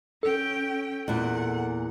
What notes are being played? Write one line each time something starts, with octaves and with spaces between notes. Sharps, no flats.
C#4 A4 G5
E2 A#2 F#5